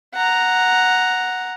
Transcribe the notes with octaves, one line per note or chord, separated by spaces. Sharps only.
F#5 A#5